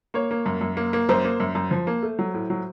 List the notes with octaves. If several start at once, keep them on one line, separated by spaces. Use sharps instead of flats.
A#3 C#5
A#3
F#2
F#2
A#3
A#3
F#2 C5
A#3
F#2
F#2
F3
A#3
A3
F#3
A2
F#3